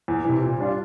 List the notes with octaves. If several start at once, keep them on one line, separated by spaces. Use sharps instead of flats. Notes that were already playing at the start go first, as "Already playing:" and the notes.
E2
C3 E3
A#2
G3 D4 F4